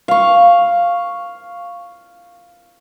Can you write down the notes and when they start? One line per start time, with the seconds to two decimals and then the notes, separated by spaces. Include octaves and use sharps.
0.08 F5 C#6